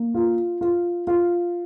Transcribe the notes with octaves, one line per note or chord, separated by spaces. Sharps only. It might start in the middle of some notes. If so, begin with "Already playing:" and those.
Already playing: A#3
F4
F4
F4